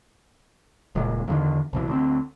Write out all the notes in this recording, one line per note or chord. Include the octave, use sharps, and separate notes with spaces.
D#1 C#2 A#2
E2 D3 D#3
C2 B2 E3
D2 C4